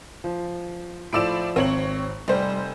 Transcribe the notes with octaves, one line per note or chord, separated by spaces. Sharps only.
F3
A2 F3 D5 E6 D7 E7
G#1 C4 C#5 F#7
F1 G3 C5